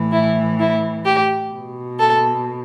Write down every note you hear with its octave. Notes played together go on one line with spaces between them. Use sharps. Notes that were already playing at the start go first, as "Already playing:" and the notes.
Already playing: A2 E3
E4
E4
G4
B2
A4